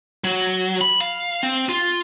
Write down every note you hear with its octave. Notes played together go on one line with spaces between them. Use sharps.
F#3
B5
F5
C4
F4